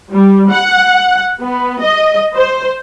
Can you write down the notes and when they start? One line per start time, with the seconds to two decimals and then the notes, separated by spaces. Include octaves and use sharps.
0.13 G3
0.50 F#5
1.40 B3
1.80 D#5
2.36 C5